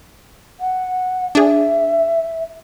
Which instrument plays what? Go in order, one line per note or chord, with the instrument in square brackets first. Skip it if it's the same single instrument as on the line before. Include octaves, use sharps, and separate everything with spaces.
[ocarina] F#5
[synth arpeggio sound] D4 G#4 [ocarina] E5